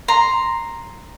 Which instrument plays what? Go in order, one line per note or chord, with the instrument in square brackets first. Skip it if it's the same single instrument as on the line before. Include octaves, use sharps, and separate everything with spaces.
[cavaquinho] A#5 C6